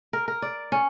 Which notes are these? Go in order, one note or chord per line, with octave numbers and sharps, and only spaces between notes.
A#4
A#4
D5
C#4